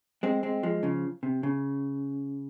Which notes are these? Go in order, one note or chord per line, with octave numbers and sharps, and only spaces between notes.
G#3 C4
G#3 C4
F3 G#3
C#3 F3
C3
C#3